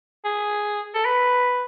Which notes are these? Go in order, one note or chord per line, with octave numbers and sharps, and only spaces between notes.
G#4
A4
B4